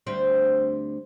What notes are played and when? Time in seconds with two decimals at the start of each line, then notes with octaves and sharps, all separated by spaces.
0.07 D2 G3 C4